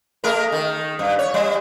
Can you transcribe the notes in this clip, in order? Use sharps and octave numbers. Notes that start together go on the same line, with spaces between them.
G#3 A3 A#4
D#3
G2
C#5
G3